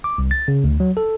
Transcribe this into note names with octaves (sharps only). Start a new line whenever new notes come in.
D6
C2
A6
C#3
D2
F#3
A4